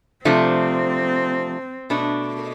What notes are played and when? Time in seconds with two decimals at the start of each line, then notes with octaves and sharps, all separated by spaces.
0.25 C3 F3 A3 C4 D4
1.90 B2 A3 D4